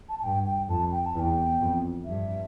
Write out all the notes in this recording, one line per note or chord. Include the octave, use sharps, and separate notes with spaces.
A5
A5
G2 G5
G5
F2 A5
G5
A5
E2
G5
F2
G2 E5